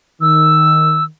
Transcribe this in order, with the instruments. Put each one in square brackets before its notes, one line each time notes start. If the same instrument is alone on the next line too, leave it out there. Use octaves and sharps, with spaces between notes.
[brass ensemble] D#3 [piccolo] E6